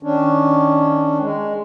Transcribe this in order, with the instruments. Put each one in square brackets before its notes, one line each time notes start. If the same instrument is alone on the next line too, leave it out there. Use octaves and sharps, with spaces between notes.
[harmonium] D#3 C#4 D4
G#3